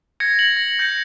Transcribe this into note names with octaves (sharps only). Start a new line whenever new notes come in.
G#6 A#6 C#7
F#7
A#6
G6 A#6 C#7